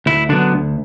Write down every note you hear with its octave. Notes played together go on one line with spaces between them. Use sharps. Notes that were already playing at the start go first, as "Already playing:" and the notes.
D2 E4
D3 F#3 B3 D4
D2